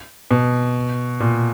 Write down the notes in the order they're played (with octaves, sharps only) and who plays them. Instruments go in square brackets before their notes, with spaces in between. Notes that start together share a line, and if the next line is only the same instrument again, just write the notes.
[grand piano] B2
A#2